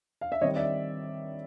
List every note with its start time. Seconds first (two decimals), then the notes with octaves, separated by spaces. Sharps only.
0.21 F5
0.32 E5
0.41 D#3 G3 C4 C#5 D#5
0.56 D5 E5